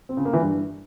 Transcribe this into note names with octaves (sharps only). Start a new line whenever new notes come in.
C4
C#3
A#3
E3
G2